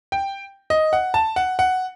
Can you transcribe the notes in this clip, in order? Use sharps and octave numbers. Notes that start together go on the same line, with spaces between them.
G5
D#5
F#5
A5
F#5
F#5